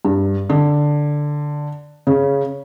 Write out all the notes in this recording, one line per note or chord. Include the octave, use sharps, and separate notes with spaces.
G2
D3
C#3